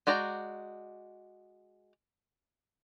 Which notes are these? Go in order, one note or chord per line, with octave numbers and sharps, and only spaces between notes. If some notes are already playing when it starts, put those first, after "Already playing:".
G#3 F#4 D5 G5 A#5